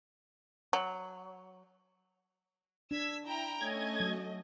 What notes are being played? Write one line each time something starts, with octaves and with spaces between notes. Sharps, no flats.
F#3
D4 E6 G#6 B6
E4 G5 A#5
A3 C#4 D#5 G#6
F#3